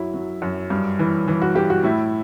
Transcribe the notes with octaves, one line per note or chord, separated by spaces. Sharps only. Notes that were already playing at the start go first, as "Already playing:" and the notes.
Already playing: F#2 F#3 E4
F#3
F#2
G2
E3
E3
F#4
G2 G4
F#4
A2 E4